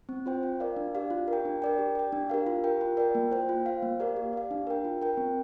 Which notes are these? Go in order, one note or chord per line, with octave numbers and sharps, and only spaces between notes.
C4
F4 C5 G5
F4
A#4 D5 F5
D4
G4 D5 F5
F4
A#4
G5
D4
A#4 D5 G5
G4
D5 G5
D4
G4 A#4 F5
F4
A#4 G5
F4
A#4 D5 G5
A#3
F4 C5 G5
F4
C5 F5
A#3
G4 A#4 D5 F5
G4
D5 F5
D4
A#4 G5
F4
A#4 G5
C4